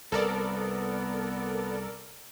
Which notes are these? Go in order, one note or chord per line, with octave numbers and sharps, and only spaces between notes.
C2 B3 A4 A#4 D5